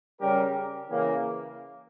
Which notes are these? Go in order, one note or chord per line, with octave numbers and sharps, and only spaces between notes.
C#3 G3 C#4 G4 A#4
C#3 E3 A#3